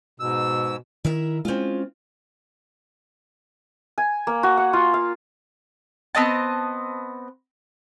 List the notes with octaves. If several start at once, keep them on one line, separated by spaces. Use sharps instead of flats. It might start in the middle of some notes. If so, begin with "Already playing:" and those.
G#2 B2 E6
D#3 E4 A#4 E5
G#3 C4 C#4 F4
G#5
A#3
F#4
F#5
F4
F5
B3 C4 D#5 A5